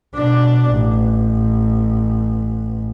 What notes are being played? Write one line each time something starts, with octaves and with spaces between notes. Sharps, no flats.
B2 D4
A1